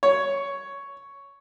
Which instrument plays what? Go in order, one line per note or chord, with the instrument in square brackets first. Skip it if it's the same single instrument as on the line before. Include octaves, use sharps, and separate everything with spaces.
[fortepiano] C#5